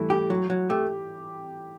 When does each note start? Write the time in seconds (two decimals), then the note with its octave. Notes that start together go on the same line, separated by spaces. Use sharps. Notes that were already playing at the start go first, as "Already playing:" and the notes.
Already playing: E3 G3 A3 E4
0.10 G4
0.30 F#3
0.50 F#3
0.69 A3 G4